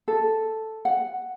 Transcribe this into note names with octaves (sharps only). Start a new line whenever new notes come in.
A4
F#5